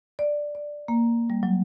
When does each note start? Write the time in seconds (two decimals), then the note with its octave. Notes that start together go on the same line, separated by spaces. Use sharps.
0.19 D5
0.55 D5
0.88 A#3
1.30 G3
1.43 F#3